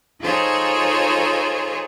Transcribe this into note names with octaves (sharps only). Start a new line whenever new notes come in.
D#4 F4 G#4 A4 C5 C#5